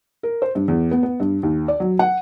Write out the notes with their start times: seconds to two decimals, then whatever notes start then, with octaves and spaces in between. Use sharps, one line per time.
0.23 A#4
0.42 C5
0.55 G2
0.68 E2
0.91 B3
1.03 B3
1.20 G2
1.43 D#2
1.68 D5
1.80 F#3
1.99 F#5